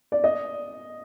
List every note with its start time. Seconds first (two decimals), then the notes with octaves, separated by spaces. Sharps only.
0.12 D5
0.24 D#5